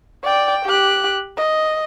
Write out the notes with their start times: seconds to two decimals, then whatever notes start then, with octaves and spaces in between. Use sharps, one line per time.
0.24 D5 G5
0.66 G4 F#6
1.37 D#5